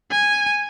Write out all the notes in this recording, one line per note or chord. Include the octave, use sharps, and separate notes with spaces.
G#5